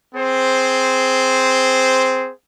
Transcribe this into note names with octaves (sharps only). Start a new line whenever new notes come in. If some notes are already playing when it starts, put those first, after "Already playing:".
C4 G#4 C5